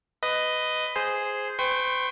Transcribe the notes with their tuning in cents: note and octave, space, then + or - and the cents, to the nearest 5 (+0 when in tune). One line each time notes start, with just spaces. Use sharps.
B4 +15 D#5 +0
G#4 +0 C5 -5
C5 -45 G5 +0 C#6 -40